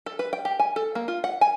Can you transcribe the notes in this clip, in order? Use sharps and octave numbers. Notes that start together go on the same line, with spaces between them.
A4
B4
G5
G4
G#5
A4
A#3
F4
F#5
G#5